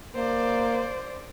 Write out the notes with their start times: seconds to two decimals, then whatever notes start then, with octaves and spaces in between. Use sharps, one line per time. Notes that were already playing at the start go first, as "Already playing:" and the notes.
0.15 A#3 C5 D5